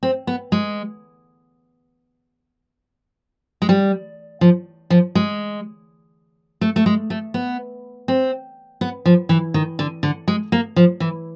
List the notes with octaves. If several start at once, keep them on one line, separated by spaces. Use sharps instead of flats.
C4
B3
G#3
G#3
G3
F3
F3
G#3
A3
A3
G#3
A3
B3
C4
B3
F3
E3
D#3
D3
D3
G#3
A#3
F3
E3